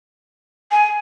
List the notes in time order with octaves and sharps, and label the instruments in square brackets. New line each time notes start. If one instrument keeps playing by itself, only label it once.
[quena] G#5